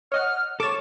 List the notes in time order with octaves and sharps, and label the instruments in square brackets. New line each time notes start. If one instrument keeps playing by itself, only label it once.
[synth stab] C#5 D#5 F#5 [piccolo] F6
[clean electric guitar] A4 C#5 [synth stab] D6 A6 [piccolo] E7